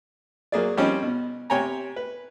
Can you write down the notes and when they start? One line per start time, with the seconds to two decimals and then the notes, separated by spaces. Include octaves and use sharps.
0.52 F#3 A#3 G#4 D5
0.77 F3 G3 C4 C#4 D#4
1.03 B2
1.50 C3 C#5 G5 G#5 A#5
1.96 B4